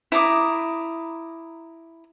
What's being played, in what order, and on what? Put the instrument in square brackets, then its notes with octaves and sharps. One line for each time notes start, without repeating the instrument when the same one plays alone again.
[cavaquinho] E4 A#5 D6 D#6